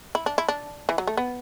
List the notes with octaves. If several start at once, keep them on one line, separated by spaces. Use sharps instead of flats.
E4
D4
E4
D4
E3
F#3
A3
B3